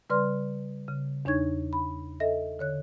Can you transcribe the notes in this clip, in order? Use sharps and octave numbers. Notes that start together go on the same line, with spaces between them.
C#3 G3 B4 D5 C6 F6
C#3
E2 D4 D#4 C#5 C#6 G#6
B5
A4 D#5 E5 A#6
D3 C#5 F#6